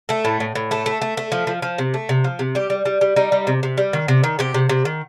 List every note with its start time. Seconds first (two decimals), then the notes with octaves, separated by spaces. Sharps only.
0.09 A3 A4
0.25 A2
0.40 A2
0.55 A2
0.71 A3 A4
0.86 A3
1.02 A3
1.17 A3
1.32 F3
1.47 F3
1.62 F3
1.78 C3
1.94 A3
2.09 C3
2.24 F3
2.39 C3
2.55 G3 G4
2.70 G3
2.85 G3
3.01 G3
3.16 G3 D#4
3.32 G3
3.47 C3
3.63 C3
3.78 G3
3.93 D#3
4.08 C3
4.24 D#3
4.39 C3 G4
4.54 C3
4.69 C3
4.85 D#3